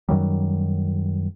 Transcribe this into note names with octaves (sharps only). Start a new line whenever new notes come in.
F#2 D#3 F#3 G3